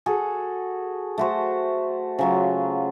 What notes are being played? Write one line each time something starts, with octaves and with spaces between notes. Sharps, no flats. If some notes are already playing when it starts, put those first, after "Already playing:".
F#4 G#4 A4
A3 F#4 C5
C#3 F#3 F4